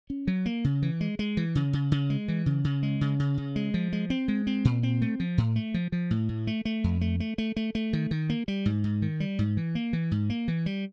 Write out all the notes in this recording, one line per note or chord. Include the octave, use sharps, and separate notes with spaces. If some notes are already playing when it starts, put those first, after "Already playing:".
C#4
F#3
A#3
C#3
E3
G#3
G#3
E3
C#3
C#3
C#3
G#3
E3
C#3
C#3
G#3
C#3
C#3
C#3
G#3
F3
G#3
C4
G#3
C4
A#2
C4
A3
F3
A2
A3
F3
F3
A2
A2
A3
A3
F2
A3
A3
A3
A3
A3
D#3
D#3
A#3
G3
G#2
G#2
D#3
G3
G#2
E3
A#3
E3
G#2
A#3
E3
G3